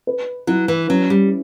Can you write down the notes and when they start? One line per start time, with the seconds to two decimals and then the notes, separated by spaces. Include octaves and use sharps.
0.07 B4
0.47 F#3 E4
0.68 E3
0.89 F#3 C#4
1.10 G3